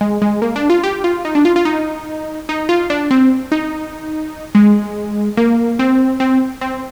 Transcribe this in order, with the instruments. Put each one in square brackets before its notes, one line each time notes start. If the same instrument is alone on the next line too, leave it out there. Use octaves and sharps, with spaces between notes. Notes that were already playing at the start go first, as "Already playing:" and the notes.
[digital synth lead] G#3
G#3
A#3
D4
F4
G4
F4
D#4
D4
F4
F4
D#4
D#4
F4
D4
C4
D#4
G#3
A#3
C4
C4
C4